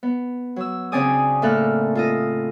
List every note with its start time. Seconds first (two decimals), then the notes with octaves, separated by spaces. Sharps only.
0.03 B3
0.56 F#3 E6
0.92 C#3 C4 D4 D5 G#5 D#6
1.42 A2 A3 A#3 A4 F6 F#6
1.95 F4 A4 D#5